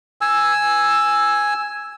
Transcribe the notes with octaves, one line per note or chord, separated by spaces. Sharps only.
G#5 E6